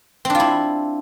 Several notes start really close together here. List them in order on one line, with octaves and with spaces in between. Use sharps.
C4 D4 F4 E4